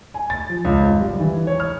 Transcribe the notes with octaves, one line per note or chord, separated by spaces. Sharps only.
G#5
A6
F3
C#2
G#1
G3
E3
C#5
F6